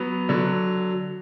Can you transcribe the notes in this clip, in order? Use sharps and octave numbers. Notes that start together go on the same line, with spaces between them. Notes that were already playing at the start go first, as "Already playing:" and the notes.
Already playing: F#3 B3
D3 F#3